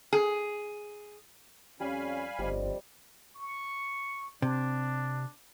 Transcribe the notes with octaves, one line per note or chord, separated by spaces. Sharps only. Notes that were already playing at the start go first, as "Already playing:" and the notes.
G#4
F2 G3 C#4 F5 G#5 B5
G1 F2 G3 C5 D#5
C#6
C3 D4